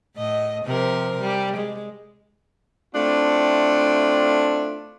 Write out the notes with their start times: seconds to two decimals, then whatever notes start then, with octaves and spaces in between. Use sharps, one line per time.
0.17 A2 D#5
0.65 C3 F3 A#4
1.20 G3
1.56 G#3
2.94 A3 C4 D4 E4 F4